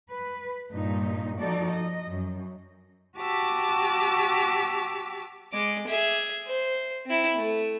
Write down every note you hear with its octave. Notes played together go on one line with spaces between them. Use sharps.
B4
G2 A#2 D#4
F3 D#4 F#4 A4 D5
D#5
F#2
F#4 G4 A5 D6 E6
G#3 D6
G#4 E5
C5
C4 E4
A3